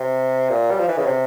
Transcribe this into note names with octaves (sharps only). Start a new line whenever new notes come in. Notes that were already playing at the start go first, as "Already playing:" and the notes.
Already playing: C3
A#2
G3
F3
E3
C#3
C3